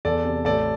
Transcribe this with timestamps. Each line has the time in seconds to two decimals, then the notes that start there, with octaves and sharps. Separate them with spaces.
0.05 E2 A4 D5
0.25 C3
0.45 A1 A4 D5